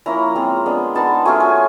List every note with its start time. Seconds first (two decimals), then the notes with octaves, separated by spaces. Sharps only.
0.06 F3 A#3 C#4 E4 A#5
0.36 G#3 C4 F4
0.66 G#3 B3 D4
0.95 G#3 B3 D#4 A5
1.25 F#3 A3 C#4 F4 G#5
1.40 G#5